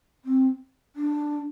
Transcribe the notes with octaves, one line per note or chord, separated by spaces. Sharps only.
C4
D4